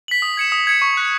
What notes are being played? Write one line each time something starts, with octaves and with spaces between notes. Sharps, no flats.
B6 F#7
D#6
G#6 C#7 E7
D#6
G#6 C#7 E7
C#6
F#6 B6